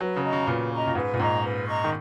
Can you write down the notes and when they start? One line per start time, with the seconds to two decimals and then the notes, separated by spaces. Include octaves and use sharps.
0.01 F#3 B4
0.16 C#3
0.24 D#5 A#5 C#6
0.33 C#3
0.47 A#2 B4
0.71 D#5 A#5 C#6
0.87 A#2
0.95 G#2 B4
1.14 A#2
1.19 G#2 D#5 A#5 C#6
1.43 B4
1.67 D#5 A#5 C#6
1.84 D#3